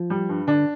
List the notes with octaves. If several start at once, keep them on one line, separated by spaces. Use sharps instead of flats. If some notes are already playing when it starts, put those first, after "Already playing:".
Already playing: F3
G3
G2
D3 D4